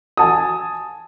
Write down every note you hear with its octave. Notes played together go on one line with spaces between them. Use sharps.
G#5 A5 D#6